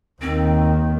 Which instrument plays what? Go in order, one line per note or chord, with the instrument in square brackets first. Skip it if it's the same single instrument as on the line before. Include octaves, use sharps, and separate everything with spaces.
[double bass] D#2 D#3 [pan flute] C4